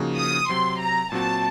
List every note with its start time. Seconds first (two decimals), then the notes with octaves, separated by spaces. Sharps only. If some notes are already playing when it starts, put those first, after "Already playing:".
Already playing: C#3 F3 A#3 D#4 F#4
0.18 D#6
0.49 C3 F#3 C4 C6
0.80 A#5
1.12 A#2 F#3 C4 F#4 A5